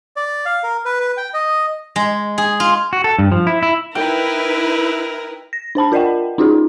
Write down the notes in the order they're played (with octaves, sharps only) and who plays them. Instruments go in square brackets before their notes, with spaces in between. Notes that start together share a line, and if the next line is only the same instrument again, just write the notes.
[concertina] D5
F5
A#4
B4
B4
G5
D#5
[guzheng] G#3
G#4
F4
[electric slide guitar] F#4
A4
G2
F3
E4
E4
[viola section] D#4 E4 B4 [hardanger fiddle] A#4 [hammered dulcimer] G5
[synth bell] A#6
D4 C5 A5 B5
F4 A#4 D5 D#5 F#5 G5
C#4 D#4 F4 F#4 G#4